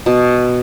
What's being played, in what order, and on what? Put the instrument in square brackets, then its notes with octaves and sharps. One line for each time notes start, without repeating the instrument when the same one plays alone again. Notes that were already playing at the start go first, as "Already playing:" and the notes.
[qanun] B2